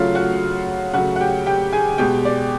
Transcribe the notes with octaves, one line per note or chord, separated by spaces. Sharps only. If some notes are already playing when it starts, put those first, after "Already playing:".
Already playing: C#3 F#3 A3 F4 F5
F#4 F#5
C#3 F#3 A3 F#4 F#5
F#5
G4 G5
G4 G5
G#4 G#5
B2 G#3 G4 G5
D5